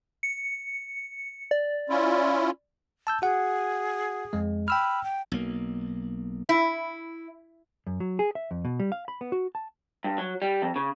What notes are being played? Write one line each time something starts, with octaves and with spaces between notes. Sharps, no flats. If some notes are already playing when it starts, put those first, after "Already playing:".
C#7
D5
C#4 E4 F4
A5 E6 G6
F#4 G#4 F#5
F2 G#3
G5 B5 E6 F6
G5
B1 A#3
E4
F#2
F#3
G#4
E5
F2
B2
G3
F5
B5
B3
F#4
A5
G2
F#3
G3
F2
C#3